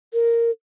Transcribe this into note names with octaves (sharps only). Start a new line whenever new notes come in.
A#4